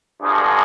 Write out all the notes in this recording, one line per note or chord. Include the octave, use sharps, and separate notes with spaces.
G2 D3 F3 G#3 G#4